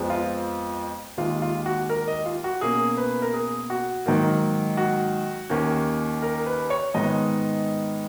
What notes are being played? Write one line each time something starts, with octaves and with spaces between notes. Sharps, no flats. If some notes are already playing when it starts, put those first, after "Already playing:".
Already playing: F2 F3 G#3 B3
F4
D#2 D#3 G#3 F4
F4
F#4
A#4
D#5
F4
F#4
B2 A#3 C#4 G#4
B4
A#4
G#4
F#4
G#2 D#3 F#3 A#3
F#4
D#2 D#3 A#3 C#4
A#4
B4
C#5
G#2 D#3 G#3 B3 D#4 D#5